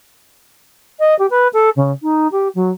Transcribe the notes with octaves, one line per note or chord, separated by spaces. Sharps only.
D#5
G4
B4
A4
C#3
D#4
G4
F#3